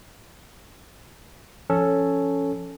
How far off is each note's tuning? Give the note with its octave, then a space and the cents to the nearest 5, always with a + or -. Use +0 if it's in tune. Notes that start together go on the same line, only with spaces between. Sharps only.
F3 -25 C#4 +0 A4 +0